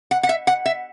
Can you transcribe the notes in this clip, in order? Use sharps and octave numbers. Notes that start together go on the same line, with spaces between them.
F#5
F#5
E5
F#5
E5